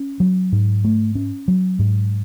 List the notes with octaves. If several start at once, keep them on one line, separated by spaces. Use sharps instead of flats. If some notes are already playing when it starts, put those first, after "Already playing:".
Already playing: C#4
F#3
G#2
A3
C#4
F#3
G#2